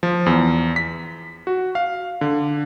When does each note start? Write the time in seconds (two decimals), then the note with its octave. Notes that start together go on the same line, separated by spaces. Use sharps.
0.03 F3
0.26 E2
0.76 B6
1.47 F#4
1.75 F5
2.21 D3